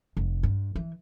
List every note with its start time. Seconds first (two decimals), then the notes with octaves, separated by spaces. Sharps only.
0.17 F1
0.43 G2
0.76 E3